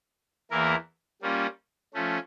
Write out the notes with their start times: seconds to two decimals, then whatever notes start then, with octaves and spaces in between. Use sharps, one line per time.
0.51 E2 E3 A#3 E4 A#4
1.22 G3 A#3 C#4 F4
1.94 F3 A3 C#4